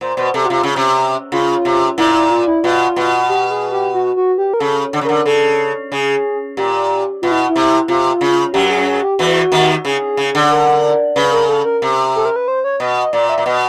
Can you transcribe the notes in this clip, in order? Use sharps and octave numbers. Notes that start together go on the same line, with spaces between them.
A#2 C5
B2 C5
C3 A4
F#4
C3 F4
C#3
C3
C#3 F4
C3
A#2 E4
E4
F4
E4
B2 F4
B2
G4
G#4
G4
F#4
F#4
G4
A#4
C#3 A4
D3
C#3
D3 A#4
C#3 A4
C#3 G#4
A#2 G4
B2 F4
E4
E4
C3
C3 F4
C#3
F#2 F#3 G4
G#4
G#4
G4
E2 E3 F#4
D#2 D#3
C#3 G#4
C#3
D3
A#4
C#3 B4
A#4
A4
A#4
C3
A4
A#4
B4
C5
C#5
B2 D#5
D#5
A#2 D5
E5
A#2
B2 D#5